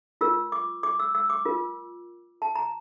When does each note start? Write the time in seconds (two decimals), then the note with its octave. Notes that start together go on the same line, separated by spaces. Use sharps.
0.21 F4 A#4 E6
0.52 D6
0.83 D6
1.00 E6
1.15 E6
1.30 D6
1.45 F4 A#4
2.42 A5
2.55 A#5